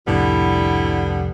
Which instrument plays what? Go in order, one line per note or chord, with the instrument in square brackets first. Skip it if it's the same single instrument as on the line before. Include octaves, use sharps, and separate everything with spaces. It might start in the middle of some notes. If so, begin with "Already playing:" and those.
[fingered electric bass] C2 F2 A2 [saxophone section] D3 G3 B3 [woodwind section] E4